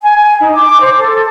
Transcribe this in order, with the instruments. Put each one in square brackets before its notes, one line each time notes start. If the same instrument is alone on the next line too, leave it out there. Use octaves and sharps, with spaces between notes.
[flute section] G#5
G#5
D#4
D6
C5
A4